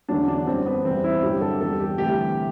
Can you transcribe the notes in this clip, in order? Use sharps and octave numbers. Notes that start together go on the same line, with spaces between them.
E2 D3 F#3 D4
D4
F#2 E3 G3 C4
B3
E2 C3 G3 C4
E4
G2 D3 F#3 G4
A4
E2 C3 G3 A4
G4
D2 C3 E3 G3 G4